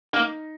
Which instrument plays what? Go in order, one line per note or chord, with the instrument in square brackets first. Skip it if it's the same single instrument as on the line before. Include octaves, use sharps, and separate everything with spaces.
[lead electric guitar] A#3 [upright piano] D#4